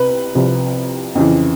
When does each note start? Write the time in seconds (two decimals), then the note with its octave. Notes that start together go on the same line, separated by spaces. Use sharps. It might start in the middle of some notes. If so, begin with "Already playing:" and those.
Already playing: C2 C3 B4
0.35 C2 C3 F3
1.15 F2 C#3 E3